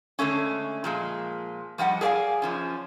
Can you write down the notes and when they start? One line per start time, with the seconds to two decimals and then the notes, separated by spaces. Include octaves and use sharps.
0.19 D3 G#3 A3 C#4
0.84 A#2 F3 G#3
1.78 F3 G3 D#5 F#5
2.01 G#4 A4 D5 E5 F5 G#5
2.42 F#2 F3 C#4